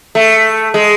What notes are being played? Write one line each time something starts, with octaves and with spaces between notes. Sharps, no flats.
A3
G#3